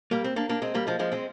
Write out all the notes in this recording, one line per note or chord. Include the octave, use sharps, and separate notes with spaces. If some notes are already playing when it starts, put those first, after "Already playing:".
G3 A#3
C4
A#3 D4
A#3 D4
G#3 C4
G3 A#3
F3 G#3
F3 G#3
G#3 C4